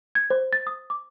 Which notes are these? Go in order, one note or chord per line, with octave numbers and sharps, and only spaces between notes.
G#6
C5
A6
D#6
D6